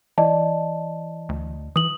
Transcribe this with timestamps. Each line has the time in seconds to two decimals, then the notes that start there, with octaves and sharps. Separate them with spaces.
0.18 E3 D5 D#5 A5
1.29 D2
1.76 E3 D#6 F#7